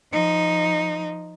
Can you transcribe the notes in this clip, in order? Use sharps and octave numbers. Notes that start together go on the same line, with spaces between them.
F3 D#4